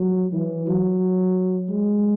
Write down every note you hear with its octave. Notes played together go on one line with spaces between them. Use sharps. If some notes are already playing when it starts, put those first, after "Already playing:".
Already playing: F#3
E3
F#3
G#3